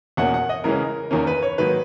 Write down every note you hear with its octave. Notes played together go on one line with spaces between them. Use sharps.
E2 B2 A#3 C#4 F#5
F#5
D#5
C#3 E3 G#3 C#4 A#4
E2 D#3 A#3 C#4 A#4
B4
C#5
G#2 D#3 F#3 A#3 B4